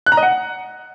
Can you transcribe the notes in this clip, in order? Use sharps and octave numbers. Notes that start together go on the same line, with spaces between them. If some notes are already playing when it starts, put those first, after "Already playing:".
F#6
A#5
D#5
F#5